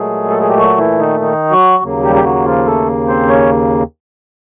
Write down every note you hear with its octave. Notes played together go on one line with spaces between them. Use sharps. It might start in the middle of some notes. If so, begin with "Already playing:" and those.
Already playing: A#2 F#3 G#3 A3 G#4
A4
G#4
G4
F#3 F#4
E3 E4
D#3 D#4
D#3 D#4
F#3 F#4
D#2 C#3 F#3 A#3
G3 G4
G4
F#3 F#4
F3 F4
A3 A4
C4 C5
C#4 C#5